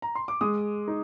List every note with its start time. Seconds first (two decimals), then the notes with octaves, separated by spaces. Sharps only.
0.02 A#5
0.15 C6
0.28 D6
0.41 G#3 D#6
0.88 D#4